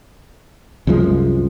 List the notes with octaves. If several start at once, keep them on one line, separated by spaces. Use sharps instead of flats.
C2 F#2 F3 G#3